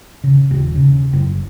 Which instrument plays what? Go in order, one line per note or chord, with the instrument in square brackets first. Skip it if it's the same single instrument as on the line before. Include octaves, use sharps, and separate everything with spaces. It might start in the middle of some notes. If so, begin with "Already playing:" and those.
[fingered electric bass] C#3
D#1
C#3
F#1